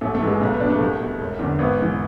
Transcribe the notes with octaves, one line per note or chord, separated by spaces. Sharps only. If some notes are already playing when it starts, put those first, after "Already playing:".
A1 A3
A3
G#2 E3
G#3
B1 A3
B3
B2 D4
A3
C2
B2
E1
E2 D3
G#1 B3
G#2 E3